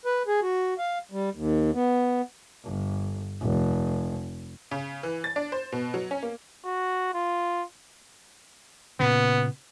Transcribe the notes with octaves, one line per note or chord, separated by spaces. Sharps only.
B4
G#4
F#4
F5
G3
D#2
B3
G1
F1
C#3
E3
A6
D4
C5
B2
F#3
C#4
A#3
F#4
F4
A#2 C#3 B3